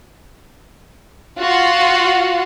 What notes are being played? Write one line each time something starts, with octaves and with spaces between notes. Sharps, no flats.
F4 F#4 F5 F#5